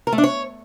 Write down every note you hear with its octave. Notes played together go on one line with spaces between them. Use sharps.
A#4
A3
D4
C#5